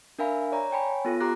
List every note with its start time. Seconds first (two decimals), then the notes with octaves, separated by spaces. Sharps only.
0.19 D4 A#4 E5 F5 G#5 B5
0.52 C#5 D5 A#5
0.71 C#5 G5 G#5 B5
1.05 B3 F4 A4
1.20 G4 A#5 D6 F#6 A#6